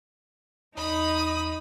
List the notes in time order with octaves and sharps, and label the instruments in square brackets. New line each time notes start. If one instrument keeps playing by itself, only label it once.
[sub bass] E2 [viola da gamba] D#4 [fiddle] B5 [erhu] D#6